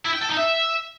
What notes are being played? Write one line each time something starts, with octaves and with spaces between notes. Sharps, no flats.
E4
G5
A4
D#4
E5